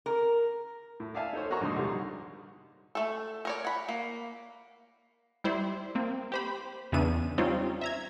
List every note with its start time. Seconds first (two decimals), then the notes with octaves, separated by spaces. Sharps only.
0.06 A#4
1.00 A2
1.15 D5 E5 F5 G#5 A5
1.33 D#4 A4 C5 C#5
1.50 A#3 F#4 D#5 A#5 C#6
1.61 A#1 G#2 D3 C6 D#6
1.76 C2 D#3 G3 G#3
2.95 A3 A4
3.45 A#4 C#5 D5
3.65 F#5 B5
3.89 A#3
5.44 G3 E4 C5 D5
5.95 A#3 C4
6.32 G4 C5 B5
6.92 E2 C#3 E3 B3 D4 D#7
7.38 G3 C4 C#4 D#4 F4
7.81 E5 A#5 G#6